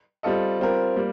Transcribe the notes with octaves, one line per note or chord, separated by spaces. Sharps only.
G3 C4 F4 A4 D#5
G3 C4 F4 A#4
G3 A#3